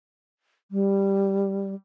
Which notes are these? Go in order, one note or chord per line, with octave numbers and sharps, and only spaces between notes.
G3